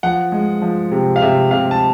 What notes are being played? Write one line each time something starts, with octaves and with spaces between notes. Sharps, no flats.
F3 F#5
G#3
F3
C3
F5
C3 E5
C3 F5
A5